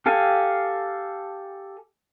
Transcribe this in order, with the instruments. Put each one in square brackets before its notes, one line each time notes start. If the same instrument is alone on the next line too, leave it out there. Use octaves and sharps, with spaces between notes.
[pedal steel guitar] G4 A4 F5 G#5